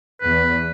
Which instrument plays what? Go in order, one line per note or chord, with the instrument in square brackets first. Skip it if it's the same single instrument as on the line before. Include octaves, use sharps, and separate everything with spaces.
[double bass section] E2 [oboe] B4